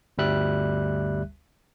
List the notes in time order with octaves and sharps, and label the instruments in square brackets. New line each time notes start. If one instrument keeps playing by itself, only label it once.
[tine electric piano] G1 D2 G3 E5 F#6